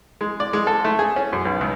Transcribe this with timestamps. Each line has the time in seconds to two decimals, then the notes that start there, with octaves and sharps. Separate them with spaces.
0.21 G#3
0.40 D5
0.53 G#3
0.67 A4
0.85 A3
0.99 G#4
1.16 C#4
1.33 F#2
1.45 B1
1.61 C#2